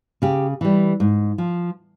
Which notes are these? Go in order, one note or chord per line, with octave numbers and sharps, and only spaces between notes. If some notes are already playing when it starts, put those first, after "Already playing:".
C#3 G4
E3 G3
G#2
F3